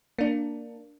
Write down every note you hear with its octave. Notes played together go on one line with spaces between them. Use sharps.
A#3 D4